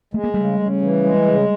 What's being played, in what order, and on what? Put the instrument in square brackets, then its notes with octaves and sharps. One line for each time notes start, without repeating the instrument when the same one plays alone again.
[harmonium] G#3 [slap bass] A3
[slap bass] A#3
[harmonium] C#3 [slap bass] G3 A3
[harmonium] C#3
E3
G#3
C#3